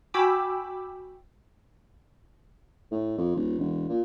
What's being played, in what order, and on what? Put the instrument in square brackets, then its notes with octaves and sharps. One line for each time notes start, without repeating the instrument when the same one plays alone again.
[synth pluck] F#4 G5 G#5 B5 D6 E6
[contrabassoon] A2
F2
D#1
E1
A#2